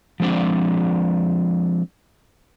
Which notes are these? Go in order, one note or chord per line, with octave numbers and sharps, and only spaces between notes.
F3 G#3 C4 D4 D5